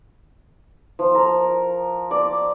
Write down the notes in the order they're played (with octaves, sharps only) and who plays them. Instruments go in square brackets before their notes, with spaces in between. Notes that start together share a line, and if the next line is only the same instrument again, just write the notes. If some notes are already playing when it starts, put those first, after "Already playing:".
[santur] F3
A#4
D5